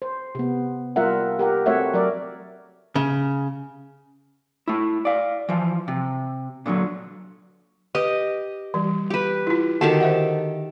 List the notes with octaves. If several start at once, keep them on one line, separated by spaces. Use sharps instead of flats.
C5
C3 B3
G3 F4 A#4 E5 F#5
G4 A#4 F#5
A3 C4 F#4 C#5 E5 F#5
F#3 A#4 D5
C#3
A3 E4
D5 F5
E3 F3
C3
A#2 D3 E3 F#3
G4 B4 D#5
E3 G3
G4 B4
E4 F4
D3 D#3 F#4 G4 A4 F#5
C5 E5 F#5